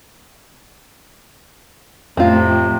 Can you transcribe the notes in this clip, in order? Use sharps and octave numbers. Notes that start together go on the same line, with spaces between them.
F2 A2 C3 C4 F4